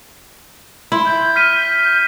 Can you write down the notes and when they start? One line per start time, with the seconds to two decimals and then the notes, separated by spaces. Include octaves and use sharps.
0.92 E4 C6
1.06 G6
1.36 F6 B6 D#7